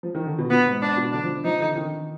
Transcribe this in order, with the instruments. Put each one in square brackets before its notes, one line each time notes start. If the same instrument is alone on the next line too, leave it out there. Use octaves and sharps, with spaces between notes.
[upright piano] F3
D#3
D3
B2
[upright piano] A#2 [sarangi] B3
[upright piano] G#2
[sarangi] D4
[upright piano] B2
[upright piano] D3 [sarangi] D4
[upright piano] F3
[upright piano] F3 [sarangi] D#4
[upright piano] D3
D#3